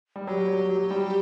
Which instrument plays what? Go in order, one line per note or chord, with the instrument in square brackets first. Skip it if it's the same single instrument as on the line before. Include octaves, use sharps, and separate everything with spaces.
[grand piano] G3
[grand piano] F#3 [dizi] G4
[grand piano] F#3
F#3
G3